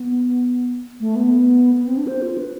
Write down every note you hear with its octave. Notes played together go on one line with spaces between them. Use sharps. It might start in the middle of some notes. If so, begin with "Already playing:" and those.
Already playing: B3
A3
B3
B3
C4
D4
C5
F4
B4